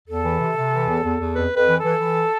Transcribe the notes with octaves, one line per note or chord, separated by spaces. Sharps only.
E2 A4
E3
C3
C3
E3
E2
E2
E2
F2 B4
F2 B4
E3
A4
E3
E3